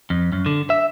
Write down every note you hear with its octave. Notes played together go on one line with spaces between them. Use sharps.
F2
F#2
D3
E5